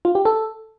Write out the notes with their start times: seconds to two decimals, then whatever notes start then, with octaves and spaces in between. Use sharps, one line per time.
0.05 F4
0.15 G4
0.25 A4